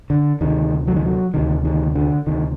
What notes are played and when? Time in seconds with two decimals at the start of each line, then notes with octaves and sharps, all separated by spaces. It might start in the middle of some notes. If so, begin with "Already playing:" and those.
0.10 D3
0.40 D2 C3 D#3
0.88 F#3
0.96 D#3
1.05 F#3
1.34 D2 C3 D#3
1.65 D#3
1.95 D3
2.27 D2 C3 D#3